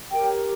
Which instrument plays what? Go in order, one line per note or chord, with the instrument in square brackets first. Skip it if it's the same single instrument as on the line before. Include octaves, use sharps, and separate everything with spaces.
[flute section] G4 A#4 C#5 G5